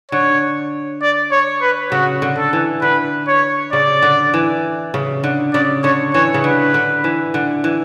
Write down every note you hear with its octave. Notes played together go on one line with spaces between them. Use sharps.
D3 C#5
D5
C#5
B4
C#3 F#4
D3
A4
E3
D3 B4
C#5
C#3 D5
D3
E3
C#3
D3
C#3 D5
D3 C#5
E3 C#5
C#3
D3 B4
D3
E3
D3
E3